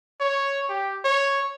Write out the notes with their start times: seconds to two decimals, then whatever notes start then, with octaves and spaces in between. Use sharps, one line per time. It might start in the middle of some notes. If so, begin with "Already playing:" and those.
0.21 C#5
0.69 G4
1.05 C#5